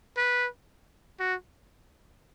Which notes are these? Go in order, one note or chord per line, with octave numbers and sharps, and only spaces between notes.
B4
F#4